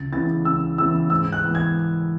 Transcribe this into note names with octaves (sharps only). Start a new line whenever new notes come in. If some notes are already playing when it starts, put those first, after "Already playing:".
Already playing: C#2 A6
C#3 E3 B3 E4 A6
C#2 E6
C#3 E3 B3 E4 E6
G#2 E6
F#6
E3 B3
G#6